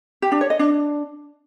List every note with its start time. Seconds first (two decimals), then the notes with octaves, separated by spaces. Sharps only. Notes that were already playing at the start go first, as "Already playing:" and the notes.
0.22 G4
0.32 D4
0.41 C#5
0.50 D#5
0.59 D4